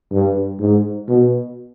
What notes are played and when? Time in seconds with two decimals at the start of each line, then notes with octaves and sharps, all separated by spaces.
0.13 G2
0.60 G#2
1.09 B2